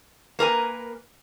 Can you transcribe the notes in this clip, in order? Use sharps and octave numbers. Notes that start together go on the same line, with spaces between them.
A#3 A#4 B4 G#5